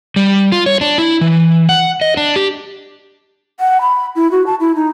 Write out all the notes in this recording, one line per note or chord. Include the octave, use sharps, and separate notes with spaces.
G3
F4
C#5
D4
E4
E3
F#5
D#5
D4
G4
F#5
B5
E4
F#4
A5
E4
D#4